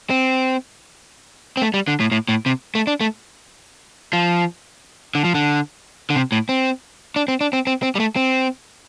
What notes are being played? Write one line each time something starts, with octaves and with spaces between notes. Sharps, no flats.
C4
C4
A3
G3
D3
A2
A2
A2
C3
A3
D4
A3
F3
D3
F3
D3
D3
C3
A2
C4
D4
C4
D4
C4
C4
C4
G3
A3
C4